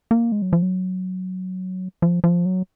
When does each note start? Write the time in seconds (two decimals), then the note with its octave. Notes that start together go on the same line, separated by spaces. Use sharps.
0.11 A#3
0.32 G#3
0.42 F#3
0.53 F3
0.62 F#3
2.02 F3
2.24 F3
2.45 F#3